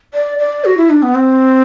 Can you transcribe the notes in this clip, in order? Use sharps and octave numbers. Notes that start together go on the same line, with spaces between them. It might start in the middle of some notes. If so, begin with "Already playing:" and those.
D5
D5
F#4
E4
D4
B3
C4